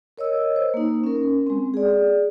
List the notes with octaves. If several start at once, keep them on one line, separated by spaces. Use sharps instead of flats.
A#4 C#5 D#5 E6
C5
A#3 D#4
C#4 A#4
G#3 C4
G#4 D5